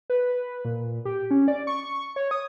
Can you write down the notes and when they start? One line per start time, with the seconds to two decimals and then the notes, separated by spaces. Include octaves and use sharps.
0.10 B4
0.65 A#2
1.05 G4
1.31 C#4
1.48 D5
1.67 C#6
2.16 C#5
2.31 D#6